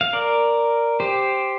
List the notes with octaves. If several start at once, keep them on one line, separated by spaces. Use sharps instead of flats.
F5
A#4 D5
G4 C5